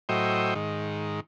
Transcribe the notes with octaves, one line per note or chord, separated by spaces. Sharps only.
A2 F#3 C5 D#5 E5 G5
G#2 D#3